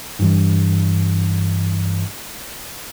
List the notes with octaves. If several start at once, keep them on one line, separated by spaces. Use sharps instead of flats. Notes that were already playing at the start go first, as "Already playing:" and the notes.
G2 E3